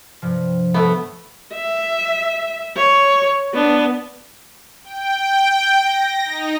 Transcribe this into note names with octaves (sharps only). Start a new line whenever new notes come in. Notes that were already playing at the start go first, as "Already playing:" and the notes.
G2 C3 F3
A3 B3
E5
C#5
B3 D4
G5
A#6
D#4